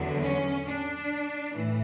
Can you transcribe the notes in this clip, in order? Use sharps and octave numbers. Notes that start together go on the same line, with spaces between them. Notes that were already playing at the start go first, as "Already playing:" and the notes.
Already playing: E2 D3 F#3
C#4
D4
A2 E3